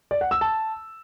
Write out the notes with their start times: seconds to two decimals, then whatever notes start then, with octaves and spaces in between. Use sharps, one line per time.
0.11 D5
0.21 F#5
0.31 E6
0.41 A5